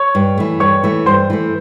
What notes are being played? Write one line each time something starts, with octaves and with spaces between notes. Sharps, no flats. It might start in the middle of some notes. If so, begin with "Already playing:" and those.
Already playing: C#5 C#6
G2
E3 A3
G2 C#5 C#6
E3 A3
G2 C5 C6
E3 A3